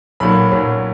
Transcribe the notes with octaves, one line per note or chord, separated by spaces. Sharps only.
B1 A#2 F#3 B5
B1 A#2 F#3